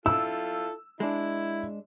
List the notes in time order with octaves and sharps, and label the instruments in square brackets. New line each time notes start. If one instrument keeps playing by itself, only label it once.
[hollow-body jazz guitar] E4 [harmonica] F4 A4 [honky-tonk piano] E6
[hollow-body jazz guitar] G#3 D4 [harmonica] E4